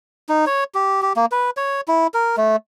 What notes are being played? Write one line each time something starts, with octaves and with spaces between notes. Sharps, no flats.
D#4
C#5
G4
G4
A#3
B4
C#5
E4
A#4
A3